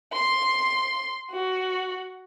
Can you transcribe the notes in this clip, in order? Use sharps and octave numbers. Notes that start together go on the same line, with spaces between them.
C6
F#4